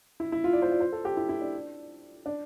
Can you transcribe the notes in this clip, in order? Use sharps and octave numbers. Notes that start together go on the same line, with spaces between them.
E4
E4
F4
D5
C5
D5
C5
A4
G4
E4
E4
D4
D4